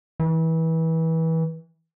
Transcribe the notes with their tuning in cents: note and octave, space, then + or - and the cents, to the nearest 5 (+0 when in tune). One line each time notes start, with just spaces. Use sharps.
E3 -25